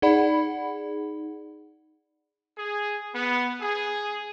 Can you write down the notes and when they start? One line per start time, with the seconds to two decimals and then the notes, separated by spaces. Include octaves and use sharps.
0.02 D#4 G#4 D5 F#5 B5
2.57 G#4
3.15 B3
3.60 G#4